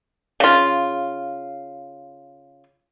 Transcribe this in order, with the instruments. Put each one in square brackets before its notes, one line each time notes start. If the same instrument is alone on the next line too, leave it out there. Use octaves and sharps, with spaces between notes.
[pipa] C#3 F4